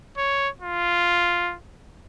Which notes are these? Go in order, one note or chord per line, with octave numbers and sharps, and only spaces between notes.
C#5
F4